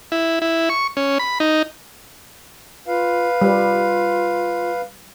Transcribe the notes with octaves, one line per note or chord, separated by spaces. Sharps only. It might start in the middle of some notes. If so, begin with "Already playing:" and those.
E4
E4
C#6
C#4
B5
D#4
F4 B4 F5
G3 F4